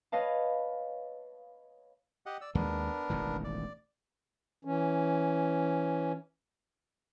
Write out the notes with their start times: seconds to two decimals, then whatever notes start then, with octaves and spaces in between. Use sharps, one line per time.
0.12 B4 C#5 D#5 F5 A5
2.26 G4 D#5 F#5
2.41 D5 E6
2.55 D#2 G#3 B3 D4 A#4
3.10 E1 A1 D#3
3.44 D5
4.65 E3 C#4